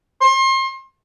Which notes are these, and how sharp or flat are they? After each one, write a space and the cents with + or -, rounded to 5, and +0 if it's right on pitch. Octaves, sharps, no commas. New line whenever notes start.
C6 +35